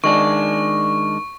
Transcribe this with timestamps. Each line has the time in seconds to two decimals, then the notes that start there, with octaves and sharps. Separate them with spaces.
0.04 D#3 G#3 D4 C#6